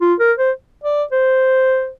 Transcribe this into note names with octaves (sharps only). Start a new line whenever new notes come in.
F4
A#4
C5
D5
C5